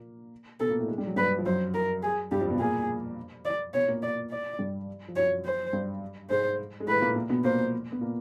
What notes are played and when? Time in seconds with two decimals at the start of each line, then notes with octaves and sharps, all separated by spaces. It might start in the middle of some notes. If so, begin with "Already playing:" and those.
Already playing: A#2 A#3
0.60 B2 B3 A4
0.69 A#2 A#3
0.79 A2 A3
0.88 G#3
0.98 G3
1.07 F#3
1.16 G2 G3 B4
1.38 F3
1.45 F#2 F#3 C5
1.74 A#4
2.03 G#4
2.31 G2 G3 G4
2.41 F2 F3
2.50 B2 B3
2.59 A#2 A#3 G#4
3.45 D5
3.74 B2 B3 C#5
3.88 A#2 A#3
4.02 D5
4.30 D5
4.59 G2 G3
5.08 F3
5.16 F#2 F#3 C#5
5.45 C5
5.73 G2 G3
6.30 G#2 G#3 C5
6.80 G#3
6.87 A2 A3 B4
7.01 A#2 A#3
7.15 A#2 A#3
7.29 B2 B3
7.44 A#2 A#3 C5
7.92 B3
8.01 A#2 A#3